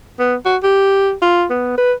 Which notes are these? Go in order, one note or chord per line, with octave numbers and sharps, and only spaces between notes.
B3
F#4
G4
F4
B3
B4